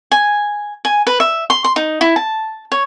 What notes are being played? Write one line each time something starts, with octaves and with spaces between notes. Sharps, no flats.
G#5
G#5
B4
E5
C6
C6
D#4
E4
A5
C#5